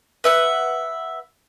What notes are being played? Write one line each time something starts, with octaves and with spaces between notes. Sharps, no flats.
B4 E5 F#5